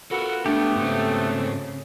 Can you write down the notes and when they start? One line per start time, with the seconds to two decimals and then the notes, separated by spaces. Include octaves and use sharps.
0.11 B3 F4 F#4 A4 A#4
0.46 G#3 A3 B3 D4 G4
0.76 G#2 C#3 C4